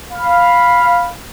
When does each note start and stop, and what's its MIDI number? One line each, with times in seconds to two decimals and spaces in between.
0.13 1.13 77
0.13 1.13 83